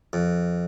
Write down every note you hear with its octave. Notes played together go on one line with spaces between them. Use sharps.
F2